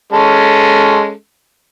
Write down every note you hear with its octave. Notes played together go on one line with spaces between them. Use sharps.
G#3 C#4 A4